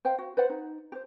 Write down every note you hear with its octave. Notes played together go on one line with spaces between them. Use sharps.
C5 F5 G5
F#4
B4 C5 D5 F#5
D#4
G4 C5